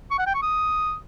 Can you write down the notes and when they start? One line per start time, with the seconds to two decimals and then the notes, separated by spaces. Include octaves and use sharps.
0.11 C#6
0.19 F#5
0.27 G5
0.34 C#6
0.42 D#6